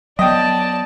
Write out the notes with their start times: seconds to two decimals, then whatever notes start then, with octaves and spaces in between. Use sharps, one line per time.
0.19 F#3 B3 D5 D#5 G5 A5